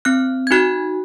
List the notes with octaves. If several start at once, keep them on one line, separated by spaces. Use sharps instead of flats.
C4 F#6
G#6
D#4 F#4 F#6